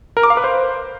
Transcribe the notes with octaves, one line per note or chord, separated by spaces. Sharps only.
A#4
D6
F5
B4
C5